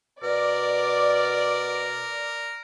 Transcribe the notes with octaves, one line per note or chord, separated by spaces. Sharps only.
B2 A#4 D5